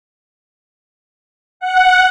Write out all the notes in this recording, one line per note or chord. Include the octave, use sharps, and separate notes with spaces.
F#5